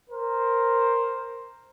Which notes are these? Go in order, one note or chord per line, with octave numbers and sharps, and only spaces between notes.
A#4 C5